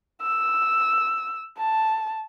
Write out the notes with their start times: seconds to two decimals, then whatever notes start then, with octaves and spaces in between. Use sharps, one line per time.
0.22 E6
1.58 A5